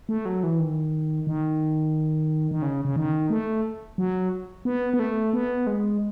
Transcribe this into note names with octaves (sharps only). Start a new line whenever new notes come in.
A3
F#3
E3
D#3
D#3
D#3
C#3
C#3
D#3
A3
F#3
B3
B3
A3
B3
G#3